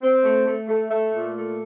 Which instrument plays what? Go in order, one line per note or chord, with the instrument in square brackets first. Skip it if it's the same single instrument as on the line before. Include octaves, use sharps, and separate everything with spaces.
[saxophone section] C4
A3
A3
A3
A3
A#2
A3